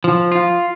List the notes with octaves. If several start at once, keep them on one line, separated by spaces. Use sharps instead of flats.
F3
F4